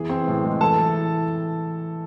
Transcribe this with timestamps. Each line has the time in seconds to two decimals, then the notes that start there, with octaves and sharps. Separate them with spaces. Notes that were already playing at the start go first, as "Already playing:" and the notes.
Already playing: E3 B3 G#4
0.09 C4
0.28 A2
0.45 G#3
0.61 E3 A4 A5
0.79 E3